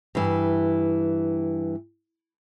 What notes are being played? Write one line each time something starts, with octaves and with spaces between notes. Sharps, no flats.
G2 E3